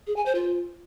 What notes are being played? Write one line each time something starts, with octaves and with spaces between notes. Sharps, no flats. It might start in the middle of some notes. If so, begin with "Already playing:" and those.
G#4
G#5
C5
F4